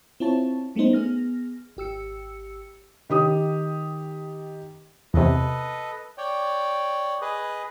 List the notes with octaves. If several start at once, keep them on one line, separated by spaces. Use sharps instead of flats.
C4 E4 F4 C#5 A5
G3 A3 B3 C#4 D#4 C5
B3 G#4 F6 A#6
G#1 G4 E6 C#7
D#3 G4 D#6
E2 C3 A4 B4 D#5
C#5 D5 G5
G#4 B4 D#5